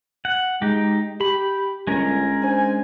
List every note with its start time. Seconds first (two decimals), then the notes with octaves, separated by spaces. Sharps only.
0.25 F#5
0.62 G#3 D#4 G4
1.21 G4 B5
1.87 G1 G#3 C#4 A#4
2.43 D4 C5 G#5